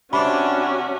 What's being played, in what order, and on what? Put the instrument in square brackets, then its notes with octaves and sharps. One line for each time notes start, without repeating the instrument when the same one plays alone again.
[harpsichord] C3 [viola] C#4 F#4 [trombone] D4 [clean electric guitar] B5